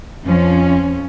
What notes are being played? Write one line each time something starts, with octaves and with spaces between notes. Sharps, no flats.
F2 F3 C#4